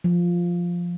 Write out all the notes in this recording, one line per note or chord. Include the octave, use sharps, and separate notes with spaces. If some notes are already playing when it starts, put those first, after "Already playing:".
F3